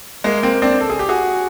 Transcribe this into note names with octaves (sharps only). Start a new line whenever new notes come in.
G#3 A#3
A#3 C4
C4 D4
A4
G#4
G4
F#4 G#4